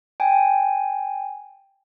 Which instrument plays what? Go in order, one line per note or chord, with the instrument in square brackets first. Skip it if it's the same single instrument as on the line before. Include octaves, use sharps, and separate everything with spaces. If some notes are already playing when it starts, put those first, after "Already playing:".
[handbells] G5 G#5